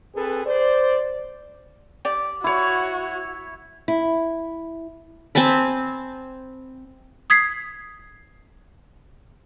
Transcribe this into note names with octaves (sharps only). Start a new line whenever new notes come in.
C4 G#4 A4 B4
C5 D5
G4 D5
E4 F#4 C#5
E4
C4 G#5 A5 B5
D#6 G#6 B6 C7